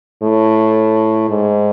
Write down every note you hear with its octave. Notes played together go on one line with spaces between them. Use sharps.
A2
G#2